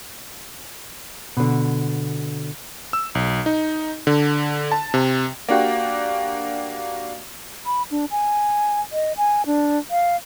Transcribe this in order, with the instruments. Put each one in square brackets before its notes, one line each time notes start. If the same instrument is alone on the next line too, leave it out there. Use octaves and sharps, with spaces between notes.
[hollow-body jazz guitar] B2 D3
[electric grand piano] E6
B1
D#4
D3
A5
C3
[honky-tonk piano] A#3 D4 F#4 G4
[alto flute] B5
D4
G#5
D#5
G#5
D4
F5